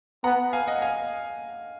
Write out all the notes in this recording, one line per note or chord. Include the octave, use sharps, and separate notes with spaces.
B3 F#5 A#5
F5 G#5
D#5 F#5
F5 G#5